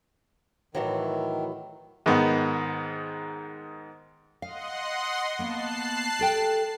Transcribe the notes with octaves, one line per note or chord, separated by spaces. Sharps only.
A2 D#3 E3 F#3
G#2 D#3 B3
D#5 F5 F#5 C6
A#3 B3 A5 F#6 C7
G4 A4 G5